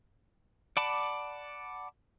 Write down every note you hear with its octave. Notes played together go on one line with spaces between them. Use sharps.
D5 F#5 A5 B5 D6